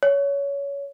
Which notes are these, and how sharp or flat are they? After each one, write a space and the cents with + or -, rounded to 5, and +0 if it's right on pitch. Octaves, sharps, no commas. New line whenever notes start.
C#5 +20